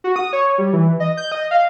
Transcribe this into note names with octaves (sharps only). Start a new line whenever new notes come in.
F#4
D#6
C#5
G3
E3
D#5
G6
D#5
F5